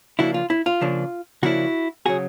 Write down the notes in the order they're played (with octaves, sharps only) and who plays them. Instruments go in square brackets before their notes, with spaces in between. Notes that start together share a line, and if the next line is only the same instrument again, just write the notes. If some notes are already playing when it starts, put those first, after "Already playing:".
[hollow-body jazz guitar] C#3 F3 A#3 D4 E4 F#4
F4
E4
F4
C#3 F3 A#3 D4
C#3 F3 A#3 D4 E4 F#4
C#3 F#3 F#4 G#4